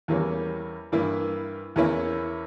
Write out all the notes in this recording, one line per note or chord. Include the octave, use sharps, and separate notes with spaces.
E2 E3 G3 A#3 C#4
G2 E3 A#3 E4
E2 E3 A#3 C#4 E4